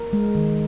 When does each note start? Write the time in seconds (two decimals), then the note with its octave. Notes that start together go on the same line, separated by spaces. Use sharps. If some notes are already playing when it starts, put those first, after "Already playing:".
Already playing: A#4
0.13 G#3
0.35 D#3